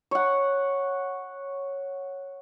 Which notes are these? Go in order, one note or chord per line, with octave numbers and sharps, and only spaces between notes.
C#5 F#5